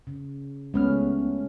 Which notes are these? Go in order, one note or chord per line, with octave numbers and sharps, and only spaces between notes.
C#3
C#2 G#3 A3 B3 C#4 F6